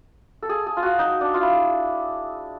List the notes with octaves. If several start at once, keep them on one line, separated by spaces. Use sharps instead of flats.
A4
G#4
G#4
F4
F#4
D#4
D4
F4
E4